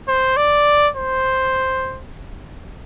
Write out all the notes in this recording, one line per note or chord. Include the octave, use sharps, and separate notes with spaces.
C5
D5
C5